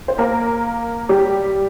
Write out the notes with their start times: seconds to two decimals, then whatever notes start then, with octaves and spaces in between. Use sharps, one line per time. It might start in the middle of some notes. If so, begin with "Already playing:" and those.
0.08 C5
0.18 A#3 A#4
1.09 G3 G4